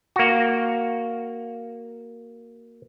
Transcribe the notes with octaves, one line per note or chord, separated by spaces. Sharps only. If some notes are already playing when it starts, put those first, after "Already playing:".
A#3 F#4